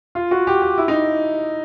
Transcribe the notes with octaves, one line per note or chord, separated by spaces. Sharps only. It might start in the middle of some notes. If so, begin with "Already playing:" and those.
F4
F#4
G4
G4
E4
D#4